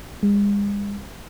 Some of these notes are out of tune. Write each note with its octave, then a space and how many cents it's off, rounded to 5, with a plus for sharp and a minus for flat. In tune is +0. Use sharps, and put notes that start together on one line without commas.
G#3 -40